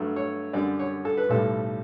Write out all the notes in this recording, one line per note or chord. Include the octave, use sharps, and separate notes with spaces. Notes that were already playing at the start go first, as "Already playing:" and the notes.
Already playing: G2 F#3 A3
C#5
F#2 D3 G3 D5
C#5
A4
B4
B1 A2 G3 A4